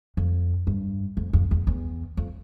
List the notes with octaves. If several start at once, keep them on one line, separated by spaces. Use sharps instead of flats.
F2
G2
F2
F2
E2
E2
F2